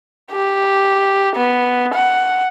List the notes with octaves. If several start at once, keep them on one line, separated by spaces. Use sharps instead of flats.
G4
B3
F#5